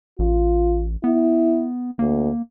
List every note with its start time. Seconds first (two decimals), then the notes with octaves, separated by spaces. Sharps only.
0.19 A1 F4
1.04 B3 E4
1.99 D2 A#3